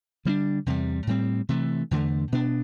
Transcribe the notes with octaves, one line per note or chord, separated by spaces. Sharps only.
D3 G3 B3 D4
E2 C3 G3
A2 G3 C4
C3 E3 A3
E2 D3 A3
B2 B3 D4